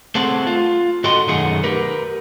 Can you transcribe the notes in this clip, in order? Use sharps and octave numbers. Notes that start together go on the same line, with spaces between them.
A3 C4 G#4 A4 C5 F#5
F4
G#2 F#4 A4 D#5 G5 C6
B1 F#2 D#3 A3 G#4 F#5
G4 A#4 B4